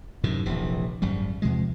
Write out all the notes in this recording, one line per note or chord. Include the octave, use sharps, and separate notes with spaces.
F#2 A2 C3 D#3
D#1 A#1 C3 E3
G#1 F#2 G3
E2 C3 F3 G#3